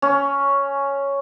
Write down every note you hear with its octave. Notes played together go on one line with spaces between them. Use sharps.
C#4